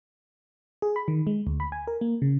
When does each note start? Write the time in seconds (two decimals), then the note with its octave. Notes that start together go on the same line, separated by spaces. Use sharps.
0.82 G#4
0.96 B5
1.08 D#3
1.27 G#3
1.47 D2
1.60 B5
1.72 G#5
1.87 A#4
2.01 A#3
2.22 C#3